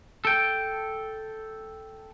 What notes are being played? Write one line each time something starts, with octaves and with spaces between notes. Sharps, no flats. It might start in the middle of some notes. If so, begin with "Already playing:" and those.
A4 G5